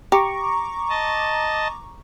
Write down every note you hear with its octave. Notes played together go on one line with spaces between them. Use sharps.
G4 A#5 C#6 D6
D#5 A5